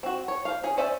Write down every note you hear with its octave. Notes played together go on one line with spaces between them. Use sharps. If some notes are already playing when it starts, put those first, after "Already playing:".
C4 F#4
C#5
C5 F5
C#4 G#4
C#4 C5 D5 E5 G#5